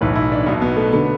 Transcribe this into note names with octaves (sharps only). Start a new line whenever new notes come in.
B1 A2 E3 B4
E4
D4
B1 B2 B3
B3
A3
D3 B3